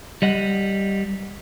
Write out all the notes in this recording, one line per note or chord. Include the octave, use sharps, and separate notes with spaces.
G3 D#5 F#5